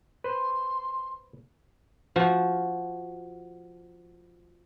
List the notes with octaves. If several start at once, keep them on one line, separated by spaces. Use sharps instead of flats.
B4 C5 C6
F3 F#4